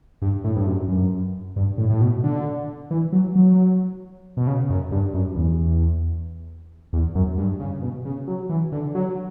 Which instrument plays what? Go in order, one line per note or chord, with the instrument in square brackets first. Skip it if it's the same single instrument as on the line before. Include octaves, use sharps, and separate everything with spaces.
[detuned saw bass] G2
A2
G2
F#2
F#2
G2
A2
A2
B2
D3
E3
F#3
F#3
B2
C#3
F#2
G2
F#2
E2
E2
F#2
G2
C#3
B2
C#3
F#3
E3
D3
F#3